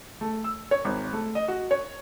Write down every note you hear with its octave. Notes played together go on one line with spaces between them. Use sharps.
A3
E6
C#5
G#1
A3
D#5
F#4
C#5